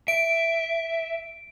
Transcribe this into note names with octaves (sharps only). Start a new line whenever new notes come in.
E5 D7